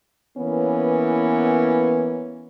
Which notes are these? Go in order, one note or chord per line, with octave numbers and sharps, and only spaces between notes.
E3 A#3 B3 C#4